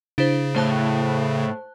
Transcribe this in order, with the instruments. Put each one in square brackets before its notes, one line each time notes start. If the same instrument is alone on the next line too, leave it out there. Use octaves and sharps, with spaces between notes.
[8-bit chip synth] C#3 [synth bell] D4 E4 C5
[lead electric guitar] A2 [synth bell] C5 A5 F#6